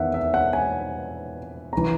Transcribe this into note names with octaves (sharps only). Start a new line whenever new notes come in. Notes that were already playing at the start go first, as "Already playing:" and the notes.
Already playing: E2 D#3 E5 F#5
E5
F#5
G#5
E3 A#5